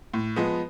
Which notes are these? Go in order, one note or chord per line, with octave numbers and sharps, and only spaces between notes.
A2
F3 G#3 B3